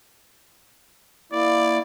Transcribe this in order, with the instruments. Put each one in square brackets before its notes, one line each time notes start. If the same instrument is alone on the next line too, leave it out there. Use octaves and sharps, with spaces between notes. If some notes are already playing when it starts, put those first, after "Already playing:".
[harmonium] A#3 E4 [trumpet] D5